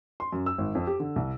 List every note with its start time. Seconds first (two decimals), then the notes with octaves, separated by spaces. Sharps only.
0.20 C6
0.32 F#2
0.46 E6
0.58 G#1
0.75 F2
0.87 G4
1.00 D3
1.16 C2